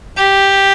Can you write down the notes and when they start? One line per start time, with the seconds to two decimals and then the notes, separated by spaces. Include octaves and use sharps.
0.17 G4